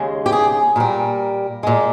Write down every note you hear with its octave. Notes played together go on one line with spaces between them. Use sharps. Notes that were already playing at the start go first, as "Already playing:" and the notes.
Already playing: D#2 C#3 G#3
G4
G#4
A#2 G3 A#4
A#2 G#3